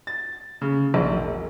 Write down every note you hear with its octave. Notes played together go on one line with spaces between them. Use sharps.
A6
C#3
A#1
E1